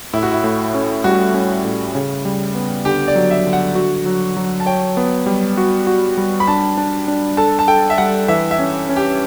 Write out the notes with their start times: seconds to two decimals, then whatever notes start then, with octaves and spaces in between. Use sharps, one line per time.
0.13 A2 E4
0.23 F#4
0.31 E4
0.44 A2
0.75 C#4
1.04 G3 F#4
1.34 C#4
1.65 A2
1.95 C#3
2.25 G3
2.55 B3
2.85 D3 G4
3.08 D5
3.16 F#3
3.31 E5
3.46 D3
3.53 F#5
3.75 F#4
4.06 F#3
4.36 F#3
4.60 A5
4.66 C#5 G5
4.97 B3
5.27 G3
5.57 F#4
5.87 F#4
6.17 G3
6.40 B5
6.48 D4 A5
6.78 D4
7.08 D4
7.37 A4 A5
7.59 A5
7.68 A4 G5
7.90 E5
7.98 G3 F#5
8.28 E3 E5
8.51 E5
8.59 C#4
8.89 C#4
8.96 G4